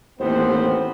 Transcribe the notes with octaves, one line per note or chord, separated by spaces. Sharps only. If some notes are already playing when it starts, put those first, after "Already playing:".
A1 D#2 B3 C4 C5